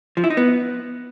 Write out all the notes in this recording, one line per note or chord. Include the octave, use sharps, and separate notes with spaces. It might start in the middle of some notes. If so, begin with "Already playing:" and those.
F3
E4
D#4
B3